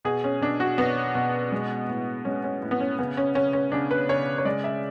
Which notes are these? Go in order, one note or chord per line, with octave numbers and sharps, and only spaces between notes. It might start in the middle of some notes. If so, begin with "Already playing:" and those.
B2 G#4
C#4
B2 D4
F#4
B2 B3
B2
G#3
A2
G#3 C#4
C#4
A2
B3
C#4
C#3 B3
C#4
C#3 C#4
C#4
C#3 D4
B4
C#3 C#5
C#5
G#3 D5
E5